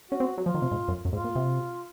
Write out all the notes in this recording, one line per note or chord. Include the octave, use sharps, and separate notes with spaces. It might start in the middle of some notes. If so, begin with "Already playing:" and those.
C#4 F#4
C4
F#3
F3 F4
D#3
C3
G#2
F#2
F#2
G#2 F4
A#2
C3